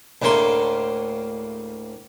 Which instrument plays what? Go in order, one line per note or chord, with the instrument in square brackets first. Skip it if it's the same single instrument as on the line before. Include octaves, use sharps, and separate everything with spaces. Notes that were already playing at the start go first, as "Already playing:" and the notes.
[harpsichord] D2 A2 C#3 A#3 C6